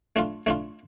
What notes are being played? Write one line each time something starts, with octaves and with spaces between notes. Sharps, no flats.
A3 D4 F4
A3 D4 F4